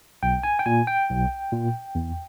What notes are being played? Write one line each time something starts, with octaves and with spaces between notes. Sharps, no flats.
B1 G5
G#5
G5
A#2 G#5
G5
B1
A#2
E2